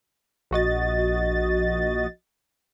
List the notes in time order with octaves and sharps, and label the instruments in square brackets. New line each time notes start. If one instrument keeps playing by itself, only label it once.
[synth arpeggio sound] A#1 F#4 D#5 A6